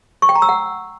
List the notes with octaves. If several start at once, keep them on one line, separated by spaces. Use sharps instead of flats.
C#6
G5
A#5
E6
F#5